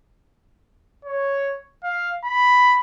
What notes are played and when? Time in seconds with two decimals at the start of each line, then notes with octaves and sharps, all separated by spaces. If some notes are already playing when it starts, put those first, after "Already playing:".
1.05 C#5
1.84 F5
2.24 B5